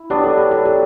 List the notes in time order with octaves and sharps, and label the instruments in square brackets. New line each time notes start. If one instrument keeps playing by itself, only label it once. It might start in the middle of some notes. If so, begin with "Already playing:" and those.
Already playing: [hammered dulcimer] E4
[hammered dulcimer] F#3 B3 D4 [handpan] G4
[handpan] A4
G4
A4
G4